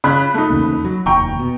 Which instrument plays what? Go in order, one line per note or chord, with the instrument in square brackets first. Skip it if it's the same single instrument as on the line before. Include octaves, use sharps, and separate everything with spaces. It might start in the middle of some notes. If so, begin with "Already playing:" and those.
[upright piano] C#3 [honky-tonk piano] B5 F#6
[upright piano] A3 D#4
[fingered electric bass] E2 C#3 A#3
F#3
[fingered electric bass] F1 D#2 [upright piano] G5 A#5 C#6
[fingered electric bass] B2